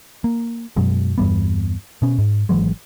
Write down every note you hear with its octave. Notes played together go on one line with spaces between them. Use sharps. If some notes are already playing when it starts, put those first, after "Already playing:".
A#3
F#2 B2 F#3 G#3
E2 G2 G3 B3
B2 C#4
G#2
G#1 E3 F#3 G#3